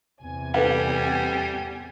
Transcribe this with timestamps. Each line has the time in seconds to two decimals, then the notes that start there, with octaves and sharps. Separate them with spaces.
0.21 E2 C3 G#5
0.54 G3 A4 B4 F#5